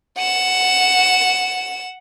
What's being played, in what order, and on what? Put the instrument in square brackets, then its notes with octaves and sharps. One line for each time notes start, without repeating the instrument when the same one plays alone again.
[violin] F#5 E7